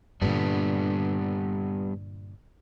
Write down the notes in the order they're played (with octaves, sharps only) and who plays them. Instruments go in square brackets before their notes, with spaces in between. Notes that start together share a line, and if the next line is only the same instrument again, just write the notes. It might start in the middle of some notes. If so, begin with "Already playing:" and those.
[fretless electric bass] G2 A#2 D3 [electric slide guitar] G3 B3 D4